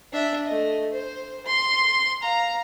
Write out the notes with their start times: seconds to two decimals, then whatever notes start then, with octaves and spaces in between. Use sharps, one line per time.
0.13 D4 E5
0.46 A3 D#5
0.92 C5
1.46 C6
2.22 F5 A#5